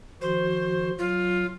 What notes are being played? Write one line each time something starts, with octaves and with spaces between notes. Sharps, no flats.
D#3 F3 F#4 C5
F#3 F4